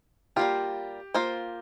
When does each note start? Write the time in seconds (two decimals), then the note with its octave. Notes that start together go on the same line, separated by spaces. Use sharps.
0.36 G3 A#3 F4 G4
1.14 A#3 F4 C5